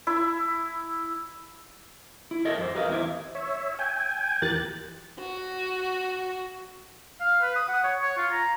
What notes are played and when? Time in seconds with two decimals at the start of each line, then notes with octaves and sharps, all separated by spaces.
0.07 E4
2.31 E4
2.45 A4 A#4 C#5 D#5 E5
2.58 F2 C5
2.75 G4 A#4 B4 D#5 F5
2.88 E2 E3 C4 E4 E5
3.35 C#5 E5
3.79 G5 G#5
4.42 E2 E3 G4 A#4 F#6 A6
5.19 F#4
7.21 F5
7.41 B4
7.56 D#6
7.69 F#5
7.84 C#5
8.01 C#5
8.17 F4
8.32 A#5